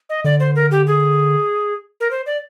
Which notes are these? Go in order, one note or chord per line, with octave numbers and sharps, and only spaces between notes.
D#5
D3 D5
C5
A#4
G4
G#4
A#4
C5
D5